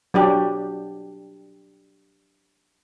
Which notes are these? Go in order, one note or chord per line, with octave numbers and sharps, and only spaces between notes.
F#3 D4 G4